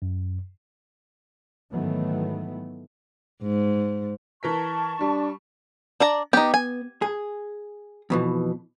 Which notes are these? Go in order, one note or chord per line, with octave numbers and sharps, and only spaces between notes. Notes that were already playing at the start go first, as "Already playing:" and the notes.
F#2
G#2 D#3 E3 F#3 A3 B3
G#2
E3 A#4 A5 C#6 B6
G3 D4
D4 D5 A#5
B3 D#4 G4
G#5
G#4
F2 B2 E3